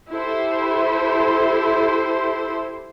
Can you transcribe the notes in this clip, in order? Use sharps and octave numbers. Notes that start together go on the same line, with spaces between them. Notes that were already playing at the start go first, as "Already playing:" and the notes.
E4 G4 A4 C5